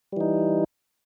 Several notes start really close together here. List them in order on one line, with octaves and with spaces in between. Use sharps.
G3 E3 D#4